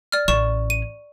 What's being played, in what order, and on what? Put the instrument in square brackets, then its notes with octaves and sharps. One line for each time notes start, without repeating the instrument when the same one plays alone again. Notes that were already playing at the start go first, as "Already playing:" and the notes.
[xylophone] D5 F6
[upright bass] A1 C#4 [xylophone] D5 C#6 E7
[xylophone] D#7